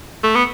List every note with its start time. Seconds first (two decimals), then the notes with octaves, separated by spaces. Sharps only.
0.24 A3
0.35 B3